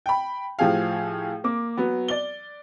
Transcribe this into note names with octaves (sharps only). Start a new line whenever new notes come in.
G5 B5
A2 F3 G4 G#4 F5
A#3 D6
F#3 B3
D5 G7